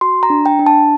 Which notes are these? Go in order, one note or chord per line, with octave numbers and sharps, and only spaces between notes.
F#4 C6
A#5
D4
G5
D4
A5